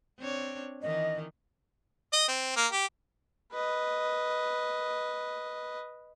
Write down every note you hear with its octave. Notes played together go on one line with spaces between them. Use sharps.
C4 D4 C#5
D#3 E3 D#5
D#5
C4
A#3
G4
B4 D#5